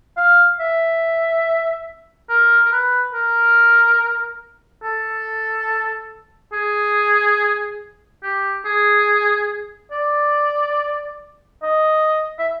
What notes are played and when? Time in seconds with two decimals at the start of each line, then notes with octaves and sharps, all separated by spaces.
0.17 F5
0.60 E5
2.29 A#4
2.65 A#4
2.72 B4
3.13 A#4
4.83 A4
6.53 G#4
8.23 G4
8.65 G#4
9.92 D5
11.63 D#5
12.39 E5